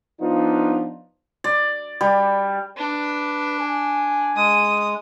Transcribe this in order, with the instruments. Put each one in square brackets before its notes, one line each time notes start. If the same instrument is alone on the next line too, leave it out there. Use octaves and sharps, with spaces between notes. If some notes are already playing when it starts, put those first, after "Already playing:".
[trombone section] F3 B3 D4 D#4 F4
[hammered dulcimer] D5
G3
[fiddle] D4 [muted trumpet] B4
[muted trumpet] G#5
[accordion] G#3 [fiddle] D#6